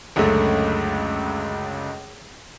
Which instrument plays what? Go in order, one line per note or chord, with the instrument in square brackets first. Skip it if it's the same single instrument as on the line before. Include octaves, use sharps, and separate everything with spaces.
[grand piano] C#2 F#2 D3 G#3 A3